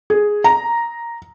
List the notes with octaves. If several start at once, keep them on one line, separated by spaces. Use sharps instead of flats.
G#4
A#5